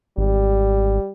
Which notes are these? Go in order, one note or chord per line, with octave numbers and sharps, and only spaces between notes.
G#1 G3